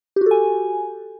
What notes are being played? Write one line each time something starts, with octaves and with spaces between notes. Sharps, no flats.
F#4 G4 A4 G#5